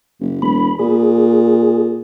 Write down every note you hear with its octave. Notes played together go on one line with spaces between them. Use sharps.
F#1
E1 B5
A#2 G#4